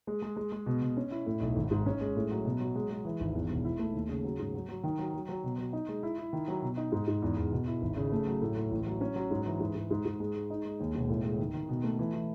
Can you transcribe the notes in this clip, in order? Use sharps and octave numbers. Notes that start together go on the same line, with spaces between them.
G#3
G#3
G#3
G#3
B2
B2
C#4
E4
A2
B1
G#1
G#2
C#4
G#3
A2
F#3
B2
F#3
G#3
G#3
E3
G#1
E2
E1
E4
A3
D#2
C#3
F#3
G#2
F#3
F#3
D#3
F#3
F#3
F#3
B2
F#3
D#4
G#3
E4
E4
D#3
F#3
B2
D#4
G#2
G#2
E2
E2
B2
E4
G#1
C#3
A3
F#3
A2
A2
A1
F#3
C#4
F#3
G#2
E3
G#2
G#2
G#2
G#2
G#3
G#3
D#4
G#3
D#2
E1
A2
G#3
D#3
D#3
B2
A3
E3
E3